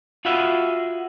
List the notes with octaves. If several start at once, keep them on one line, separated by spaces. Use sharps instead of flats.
F4 F#4 G#4 B4 E5 F5